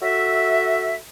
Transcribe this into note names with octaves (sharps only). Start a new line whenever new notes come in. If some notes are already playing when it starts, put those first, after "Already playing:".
F#4 A4 E5